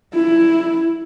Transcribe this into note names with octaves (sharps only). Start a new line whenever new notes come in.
E4